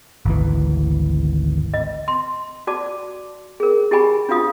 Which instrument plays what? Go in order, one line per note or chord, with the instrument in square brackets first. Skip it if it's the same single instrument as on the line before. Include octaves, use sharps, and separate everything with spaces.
[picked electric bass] G#1 D2 E3
[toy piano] D#5
C6
F#4 D5 A5 D6
G#4 A#4
E4 G4 G#4 G#5 B5
D4 F4 F#4 F5 D#6